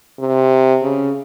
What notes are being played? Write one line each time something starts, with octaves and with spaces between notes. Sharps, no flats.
C3
C#3